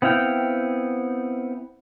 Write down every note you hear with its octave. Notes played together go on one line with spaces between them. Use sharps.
B3 C4 E4 F5 G5